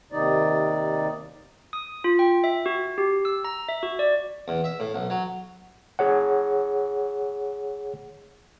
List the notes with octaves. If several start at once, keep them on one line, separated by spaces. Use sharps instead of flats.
D#2 C3 D#3 D#4 D5
D#6
F4
G5
E5
F#4
G4
E6
A#5
E5
F#4
D5
E2
E5
A2
B1
F#3
G#4 C#5 F#5